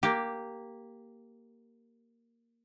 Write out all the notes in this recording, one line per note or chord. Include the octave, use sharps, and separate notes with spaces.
A#3 G4